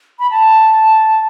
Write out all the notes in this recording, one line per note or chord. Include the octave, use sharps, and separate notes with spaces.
B5
A5